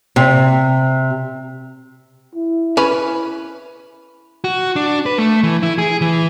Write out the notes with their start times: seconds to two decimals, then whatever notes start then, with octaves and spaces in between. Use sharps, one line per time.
0.16 C3
2.35 E4
2.77 C#4 B4
4.44 F#4
4.76 D4
5.06 B4
5.18 A3
5.43 E3
5.63 E4
5.78 G#4
6.02 E3